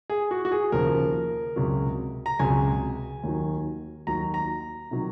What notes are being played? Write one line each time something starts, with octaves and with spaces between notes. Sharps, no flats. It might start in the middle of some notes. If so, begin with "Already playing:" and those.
G#4
F#4
F#4
G#4
D#2 C#3 F3 A#4
C#2 C3 F#3
A#5
C#2 C3 F#3 G#5
D#2 D#3 F#3
D#2 D#3 F#3 A#5
A#5
C3 D#3 F#3